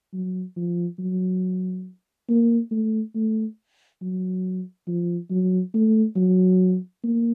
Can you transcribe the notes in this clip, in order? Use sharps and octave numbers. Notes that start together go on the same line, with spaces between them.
F#3
F3
F#3
A#3
A3
A3
F#3
F3
F#3
A3
F#3
A#3